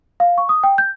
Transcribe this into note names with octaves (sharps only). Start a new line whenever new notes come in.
F5
C#6
D#6
G5
G6